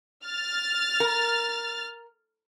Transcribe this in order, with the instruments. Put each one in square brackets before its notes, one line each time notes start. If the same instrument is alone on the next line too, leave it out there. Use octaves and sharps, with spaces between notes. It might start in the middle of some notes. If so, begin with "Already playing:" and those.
[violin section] F6 A6
[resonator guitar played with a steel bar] A#4